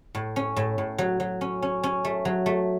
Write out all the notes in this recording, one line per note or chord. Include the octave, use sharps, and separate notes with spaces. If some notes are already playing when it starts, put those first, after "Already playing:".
A2
C#4
A2
A2
F#3
F#3
C#4
C#4
C#4
A3
F#3
A3